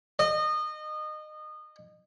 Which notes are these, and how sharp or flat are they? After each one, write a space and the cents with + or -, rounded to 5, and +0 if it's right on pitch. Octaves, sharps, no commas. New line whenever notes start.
D#5 -25